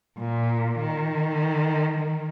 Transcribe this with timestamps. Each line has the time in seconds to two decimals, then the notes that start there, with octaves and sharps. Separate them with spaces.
0.17 A#2
0.77 D#3
1.98 D#3